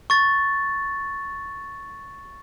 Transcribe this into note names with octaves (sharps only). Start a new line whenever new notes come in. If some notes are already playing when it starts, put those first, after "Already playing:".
C#6 A6